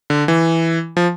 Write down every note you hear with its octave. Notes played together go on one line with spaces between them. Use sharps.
D3
E3
F3